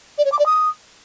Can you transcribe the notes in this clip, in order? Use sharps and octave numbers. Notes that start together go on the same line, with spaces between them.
D5
C#5
D6
D5
D#6